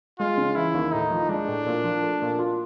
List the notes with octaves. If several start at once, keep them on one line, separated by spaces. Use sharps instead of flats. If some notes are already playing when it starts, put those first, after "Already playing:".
G#3 F4
C#3
E3 E4
D#2
A2 D#4
F3
G#3 D4
A2
A#2
F3
A3
A#2
F4